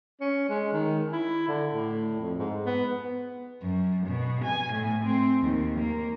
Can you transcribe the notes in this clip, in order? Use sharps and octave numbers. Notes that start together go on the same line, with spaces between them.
C#4
G#3
D#3
E4
D3
A2
F2
G#2
B3
F#2
B2
G#5
A2
C4
D#2
A#3